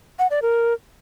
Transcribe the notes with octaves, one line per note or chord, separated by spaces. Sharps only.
F#5
D5
A#4